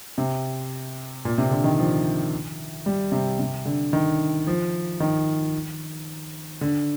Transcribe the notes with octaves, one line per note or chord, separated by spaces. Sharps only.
C3
A#2
C3
D3
D#3
F3
G3
C3
C3
D3
D#3
F3
D#3
D3